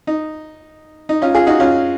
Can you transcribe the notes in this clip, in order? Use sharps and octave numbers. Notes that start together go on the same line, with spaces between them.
D#4
D#4
C#4 F4
F4 G#4
D#4 F#4
C#4 F4